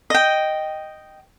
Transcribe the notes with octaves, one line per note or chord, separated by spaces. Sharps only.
D#5 G5